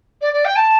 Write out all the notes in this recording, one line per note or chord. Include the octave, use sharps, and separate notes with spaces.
D5
D5
G5
A5